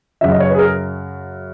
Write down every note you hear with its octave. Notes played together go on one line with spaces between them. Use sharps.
F#2 C#3 F#3 E5
D#5
C#5
B4
G#4
A#4